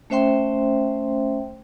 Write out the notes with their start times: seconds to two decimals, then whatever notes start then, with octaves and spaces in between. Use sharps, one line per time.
0.10 A3 C#4 C5 E5 G5 C6